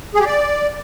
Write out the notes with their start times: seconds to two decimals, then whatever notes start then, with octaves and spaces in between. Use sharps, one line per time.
0.15 G#4
0.20 G4
0.26 D5